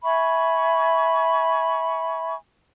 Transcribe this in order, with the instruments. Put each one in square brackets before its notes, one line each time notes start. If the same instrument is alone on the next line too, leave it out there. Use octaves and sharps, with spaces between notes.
[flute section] E5 G#5 B5 C#6